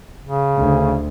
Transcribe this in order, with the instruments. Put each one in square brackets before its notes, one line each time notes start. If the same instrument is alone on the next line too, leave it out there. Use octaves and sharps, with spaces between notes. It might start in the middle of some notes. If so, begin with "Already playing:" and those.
[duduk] C#3
[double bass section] D2